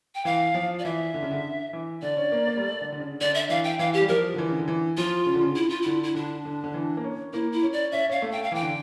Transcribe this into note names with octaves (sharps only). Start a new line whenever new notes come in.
G5
E3 F5
F3
D5
E3 E5
D3
C#3
D3
E3
D3 D5
C#4
A#3
A#3
G3
A3
D3
D3
C#3
D3 D5
E5
E3 F5
G5
E3 F5
G4
G3
F3 A#4
D3
E3
C#3
D3
E3
F3 F4
C#3
D3
C#3
E4
F4
D3 E4
E4
D3 D4
D3
D3
E3
A#3
C#4
A#3 E4
E4
C#4
D5
C#4 E5
C#4 F5
A3
G5
F5
E3 G5
D3